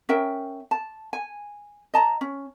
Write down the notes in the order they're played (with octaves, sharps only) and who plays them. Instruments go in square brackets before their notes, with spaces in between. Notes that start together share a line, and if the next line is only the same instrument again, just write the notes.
[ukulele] C#4 A#4 E5 G5
A5
G#5
D#5 A5 A#5
C#4